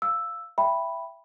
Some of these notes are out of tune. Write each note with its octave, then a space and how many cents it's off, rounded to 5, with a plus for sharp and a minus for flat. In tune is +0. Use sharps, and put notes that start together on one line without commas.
F5 +0 E6 +0
E5 +15 G5 +0 B5 +0